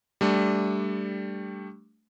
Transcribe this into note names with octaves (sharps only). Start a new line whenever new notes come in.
G3 A3 D4